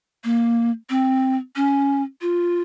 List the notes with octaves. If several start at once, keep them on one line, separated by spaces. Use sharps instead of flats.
A#3
C4
C#4
F4